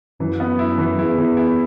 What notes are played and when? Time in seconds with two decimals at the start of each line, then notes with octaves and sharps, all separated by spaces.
0.20 F#2 E3
0.40 B3
0.59 E4
0.78 E3
0.98 E2 E4
1.18 E3
1.37 E4